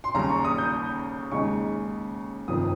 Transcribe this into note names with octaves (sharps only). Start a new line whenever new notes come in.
C6
D#2 C#3 G3 A#5
C#6
D#6
G6
D#2 C#3 G#3 D#4 C#6
G1 F2 C3 D#3 D#6